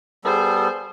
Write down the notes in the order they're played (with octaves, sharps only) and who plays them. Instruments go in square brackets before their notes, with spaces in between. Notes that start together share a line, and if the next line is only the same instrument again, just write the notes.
[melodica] G3 B3 A4 [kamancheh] G#4 C5